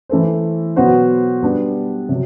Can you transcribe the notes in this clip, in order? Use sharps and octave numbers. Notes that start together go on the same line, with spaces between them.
E3 A3 E4 A4 C5
B2 F#3 B3 F#4 C5
G3 B3 D4
C3 F#3